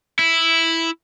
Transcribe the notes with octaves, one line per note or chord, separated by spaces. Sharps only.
E4